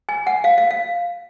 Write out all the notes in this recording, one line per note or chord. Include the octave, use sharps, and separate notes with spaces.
G#5
F#5
F5
F5
F5